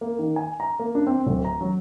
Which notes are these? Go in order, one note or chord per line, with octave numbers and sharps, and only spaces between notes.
A#3
D#3
G#5
A#5
A#3
D4
C4
D1
A#5
F#3